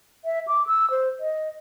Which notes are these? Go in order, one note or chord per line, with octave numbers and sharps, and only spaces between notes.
E5
D6
E6
C5
D#5